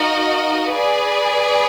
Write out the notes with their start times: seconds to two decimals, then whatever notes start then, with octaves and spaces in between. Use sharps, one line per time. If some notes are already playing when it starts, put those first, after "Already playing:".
Already playing: D#4 F#4 A#4 D#5 F5
0.71 G#4 B4 D5